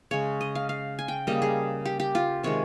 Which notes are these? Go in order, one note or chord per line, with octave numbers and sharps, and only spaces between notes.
C#3 G#3 C#5
D#5
F5
F5
G#5
G5
C#3 G3 A#3 D#5
G#4
G4
G4
F4
C3 D#3 G#3 C#5